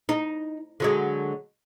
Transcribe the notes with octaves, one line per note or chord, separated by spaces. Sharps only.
D#4
D3 F#3 G#3